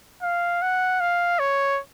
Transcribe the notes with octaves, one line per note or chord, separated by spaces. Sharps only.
F5
F#5
F5
C#5